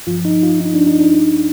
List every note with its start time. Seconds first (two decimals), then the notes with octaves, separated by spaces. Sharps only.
0.07 G2 F3 F4
0.25 D#4
0.43 F4
0.60 D#4
0.74 D4
0.87 D#4
1.00 D4
1.14 D4